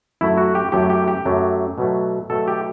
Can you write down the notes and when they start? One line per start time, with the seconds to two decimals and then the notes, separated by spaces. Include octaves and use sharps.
0.21 F#2 F#3 A3 E4
0.38 F#4
0.55 G4
0.72 F#2 F#3 A3 G4
0.90 G4
1.08 G4
1.25 F#2 F#3 A3
1.78 B2 F#3 A3
2.30 B2 F#3 A3 A4
2.48 G4